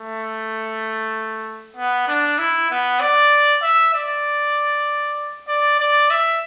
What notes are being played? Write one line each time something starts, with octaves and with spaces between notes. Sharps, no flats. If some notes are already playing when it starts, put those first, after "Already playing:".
Already playing: A3
B3
D4
E4
B3
D5
E5
D5
D5
D5
E5